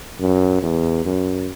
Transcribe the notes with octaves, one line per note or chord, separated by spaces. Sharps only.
F#2
E2
F#2